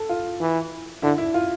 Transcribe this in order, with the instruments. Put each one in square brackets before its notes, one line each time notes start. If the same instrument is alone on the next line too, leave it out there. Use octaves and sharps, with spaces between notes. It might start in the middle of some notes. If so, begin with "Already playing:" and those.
Already playing: [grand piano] A4
F4
[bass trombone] E3
[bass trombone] D3 [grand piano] E4
[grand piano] E4
F4